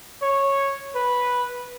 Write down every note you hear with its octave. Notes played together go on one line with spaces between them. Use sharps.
C#5
B4